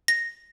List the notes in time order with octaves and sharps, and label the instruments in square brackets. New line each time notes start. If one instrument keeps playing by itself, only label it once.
[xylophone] A#6